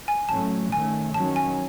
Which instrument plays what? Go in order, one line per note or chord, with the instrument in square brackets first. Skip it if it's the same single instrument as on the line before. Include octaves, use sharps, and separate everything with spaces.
[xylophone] G#5
[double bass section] A2 F#3 A3 C#4 [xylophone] A5
[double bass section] D#3 A3 C#4 [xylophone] G#5
[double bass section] D#3 F#3 C#4 [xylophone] A5
[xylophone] G#5